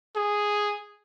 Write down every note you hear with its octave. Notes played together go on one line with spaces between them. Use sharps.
G#4